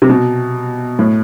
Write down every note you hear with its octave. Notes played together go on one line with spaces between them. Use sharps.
C3
B2
A2